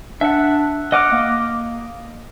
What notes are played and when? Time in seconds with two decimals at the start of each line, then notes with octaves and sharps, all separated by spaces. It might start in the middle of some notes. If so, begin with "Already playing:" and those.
0.21 D4 E5 F#5
0.92 D#5 F#5 D6 F6
1.12 A#3